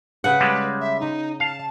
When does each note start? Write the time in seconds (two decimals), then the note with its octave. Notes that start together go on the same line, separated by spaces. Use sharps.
0.24 C#3 B4 F#5
0.40 G3 G#3
0.81 E5
1.00 D#4
1.40 F5 A5